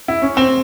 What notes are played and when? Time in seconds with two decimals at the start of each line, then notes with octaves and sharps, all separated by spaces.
0.08 E4
0.22 C#4
0.37 C4